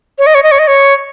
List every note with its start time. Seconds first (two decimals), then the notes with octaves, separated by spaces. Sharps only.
0.19 C#5
0.27 D#5
0.35 C#5
0.43 D#5
0.52 C#5
0.59 D#5
0.67 C#5